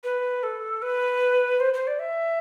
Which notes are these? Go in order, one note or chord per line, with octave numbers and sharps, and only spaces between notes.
B4
A4
B4
C5
C5
D5
E5